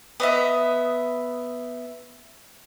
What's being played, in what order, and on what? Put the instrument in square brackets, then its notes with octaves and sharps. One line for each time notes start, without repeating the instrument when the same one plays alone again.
[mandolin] B3 D#5 E5